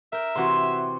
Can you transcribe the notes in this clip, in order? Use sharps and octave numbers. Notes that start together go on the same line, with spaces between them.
A#4 E5 G5
C3 E3 C4 F#4 C6